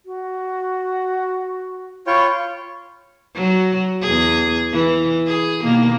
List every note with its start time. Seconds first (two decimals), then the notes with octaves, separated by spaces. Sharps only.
0.05 F#4
2.07 F4 C#5 G5 B5 C#6
3.35 F#3 F#4
4.02 E2 G#4
4.72 E3
5.27 G#4
5.64 B2 D#3 A#3